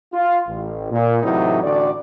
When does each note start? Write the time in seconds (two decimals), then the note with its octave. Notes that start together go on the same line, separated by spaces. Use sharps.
0.14 F4
0.47 A1
0.91 A#2
1.23 A2 C3 E3 F#3 D#4 E4
1.63 A1 D3 F#4 D5